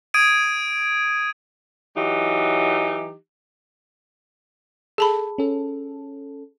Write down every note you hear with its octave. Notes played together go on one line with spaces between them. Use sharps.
D#6 G#6 D7 D#7
E3 F#3 D#4 G4
G#4 A4 A5 B5
C#4 A4